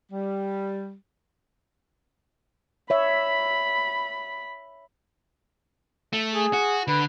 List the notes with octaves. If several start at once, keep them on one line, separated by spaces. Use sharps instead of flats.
G3
C#5 E5 B5
A3
G#4
F#4
D3 B4